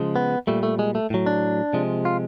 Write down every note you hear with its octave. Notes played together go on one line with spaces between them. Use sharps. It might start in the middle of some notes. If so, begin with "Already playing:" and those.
Already playing: C#3 F3 G#3
B3
A#2 G3 A3
A3
G#3
A3
A2 F#3
D4
C3 F3 G#3
F4